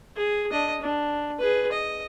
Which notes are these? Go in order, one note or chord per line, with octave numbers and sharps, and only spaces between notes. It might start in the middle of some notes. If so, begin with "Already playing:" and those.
G#4
D4 D#5
D4
G#4 B4
D#5